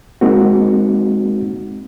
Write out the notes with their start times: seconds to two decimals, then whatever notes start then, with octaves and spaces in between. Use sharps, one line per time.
0.21 G#3 A#3 C4 D#4 F#4